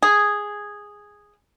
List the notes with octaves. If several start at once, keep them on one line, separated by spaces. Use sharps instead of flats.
G#4